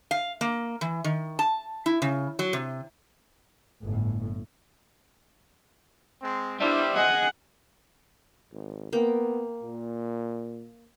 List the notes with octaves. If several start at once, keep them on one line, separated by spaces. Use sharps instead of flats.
F5
A#3
E3
D#3
A5
E4
C#3
F#3
C3
G1 A2
G#3 C4
G3 B3 D4 E4 C5 E5
G#4 D#5 F#5
G#1
A#3 B3 G5
A#2